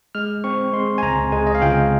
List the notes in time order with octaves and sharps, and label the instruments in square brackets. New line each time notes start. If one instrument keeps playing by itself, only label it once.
[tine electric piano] G#3 F6
C4 C#6
G#3 C6
G#5
C#2 A#5
G#3 G#5
D#5
F5
C#2 G5